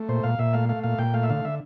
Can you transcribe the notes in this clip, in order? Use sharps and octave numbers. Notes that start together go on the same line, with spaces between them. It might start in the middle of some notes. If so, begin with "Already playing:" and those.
Already playing: A3
A#2 C5
A#2 F5
A#2 E5
A3 F5
A3 F5
A#2 F5
A#2 G5
A3 F5
E5
D3 F5
D3 E5